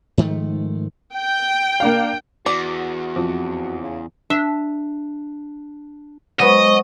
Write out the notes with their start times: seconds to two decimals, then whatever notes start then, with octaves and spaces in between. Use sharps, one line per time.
0.18 G#2 D#3 F3 A3
1.13 G5
1.80 A#3 D4 F5
2.46 E2 F#4 D5
3.16 F2
3.80 C#3
4.30 D4 E5
6.40 F#3 G#3 B3 C5 D#5 C#6